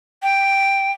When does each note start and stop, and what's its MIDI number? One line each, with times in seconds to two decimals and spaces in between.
0.23 0.92 79